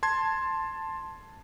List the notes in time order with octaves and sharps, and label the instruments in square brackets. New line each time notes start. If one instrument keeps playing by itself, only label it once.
[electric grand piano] A5 C6 G#6